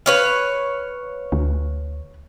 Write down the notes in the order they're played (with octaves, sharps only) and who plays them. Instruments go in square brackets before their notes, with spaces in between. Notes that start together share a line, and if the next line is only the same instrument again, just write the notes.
[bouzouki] B4 C#5 F5
[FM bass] D2